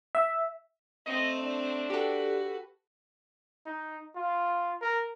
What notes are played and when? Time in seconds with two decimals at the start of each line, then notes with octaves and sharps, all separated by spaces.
0.15 E5
1.06 A3 C4 D#5
1.39 D4
1.90 F#4 G4 A4 B4
3.66 D#4
4.15 F4
4.81 A#4